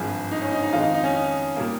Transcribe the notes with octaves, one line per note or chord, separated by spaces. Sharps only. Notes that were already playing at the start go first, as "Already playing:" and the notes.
Already playing: G#1 G2 F3 G#3 G#4
D#4
C#4
D#4
D#4
F2 D#3 G#3 F4
D#4
D#4
C#4
D#4
A#2 G3 A#3